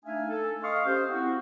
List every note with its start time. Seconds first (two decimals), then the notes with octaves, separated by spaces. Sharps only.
0.05 A3 D4 D#4 E5 F5 G#5
0.30 A4
0.63 D#5 F5 C6 C#6 D#6 F6
0.85 C#4 G4 C5
1.09 C4 E4 F#4